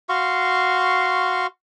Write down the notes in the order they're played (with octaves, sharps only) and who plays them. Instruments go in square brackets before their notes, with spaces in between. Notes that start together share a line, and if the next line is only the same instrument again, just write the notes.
[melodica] F#4 F5 C6 C#6